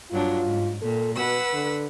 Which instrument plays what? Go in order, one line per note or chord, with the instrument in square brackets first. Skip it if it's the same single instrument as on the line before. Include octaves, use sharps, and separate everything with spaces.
[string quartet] G2 F#3 D4 [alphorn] F4
[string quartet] G#2
[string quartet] A#2 [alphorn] A4
[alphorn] B2 [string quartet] B4 F#5 E6
[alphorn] D3